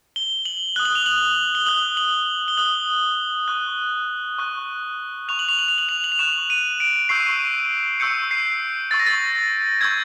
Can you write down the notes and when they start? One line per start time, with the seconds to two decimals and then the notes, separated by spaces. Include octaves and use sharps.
0.16 G7
0.46 F#7
0.76 D#6 F#6 G7
0.85 F#7
0.95 F7
1.06 F#7
1.55 G7
1.66 D#6 F#6 F#7
1.97 F#7
2.48 G7
2.57 D#6 F#6 F#7
3.48 C#6 F#6
4.38 C#6 F#6
5.28 C#6 F#6 F7
5.39 F#7
5.49 F7
5.59 F#7
5.68 F7
5.78 F#7
5.89 F7
6.04 F#7
6.12 F7
6.19 C#6 F#6 E7
6.50 D#7
6.80 D7
7.09 C#6 E6 G6 C7
8.00 C#6 E6 G6 C#7
8.31 C7
8.91 C#6 E6 G6 A6
8.99 A#6
9.07 A6
9.81 C#6 E6 G6 G#6